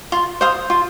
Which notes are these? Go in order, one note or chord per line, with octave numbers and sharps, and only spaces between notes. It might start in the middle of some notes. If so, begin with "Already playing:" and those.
F4
C5 F5 D#6
F4